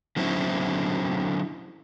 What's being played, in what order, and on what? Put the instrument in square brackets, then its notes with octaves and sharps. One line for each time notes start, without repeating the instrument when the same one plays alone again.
[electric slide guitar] D3 F#3 C4 C#4 E4